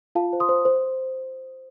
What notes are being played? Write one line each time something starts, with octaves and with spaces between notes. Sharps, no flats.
F4 F5 A5
C5
C6 D#6
C5
C5